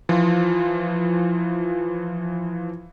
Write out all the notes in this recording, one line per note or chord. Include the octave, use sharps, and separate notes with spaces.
E3 F3 F4